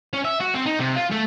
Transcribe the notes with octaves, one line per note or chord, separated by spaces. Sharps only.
C#4
E5
F#4
C4
D#4
C3
F4
A3